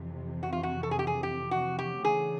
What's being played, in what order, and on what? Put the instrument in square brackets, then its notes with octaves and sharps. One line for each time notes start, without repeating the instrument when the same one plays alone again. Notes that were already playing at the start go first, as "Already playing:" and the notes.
Already playing: [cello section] F2 C3 E3
[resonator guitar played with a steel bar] F#4
F4
F#4
A4
G#4
G4
G#4
G4
F#4
G4
[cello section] C#3 E3 A3 D4 [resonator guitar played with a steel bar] G#4